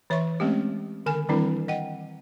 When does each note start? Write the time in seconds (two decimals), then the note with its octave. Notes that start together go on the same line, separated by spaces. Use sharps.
0.10 E3 C#5 E5 C6 C#6
0.40 G#3 A3 C4 C#4 G4
1.06 D3 D#3 A#4 G#5
1.29 D#3 E3 G3 C4 D4 E4
1.68 D#5 F#5 G5